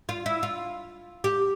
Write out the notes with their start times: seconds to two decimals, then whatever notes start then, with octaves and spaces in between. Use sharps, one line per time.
0.09 F4
0.26 E4
0.43 F4
1.24 G4